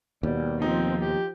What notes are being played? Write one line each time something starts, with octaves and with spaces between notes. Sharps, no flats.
D#2 B2 G3
F3 C4 D#4
G4